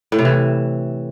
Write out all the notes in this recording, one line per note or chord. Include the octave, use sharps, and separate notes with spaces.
A2
C3
E3